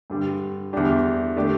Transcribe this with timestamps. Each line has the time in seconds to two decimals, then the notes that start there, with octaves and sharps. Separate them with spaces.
0.10 G2 D3 G3
0.73 E2 D3 G3 D4 G4
1.36 D3 A3 D4 G4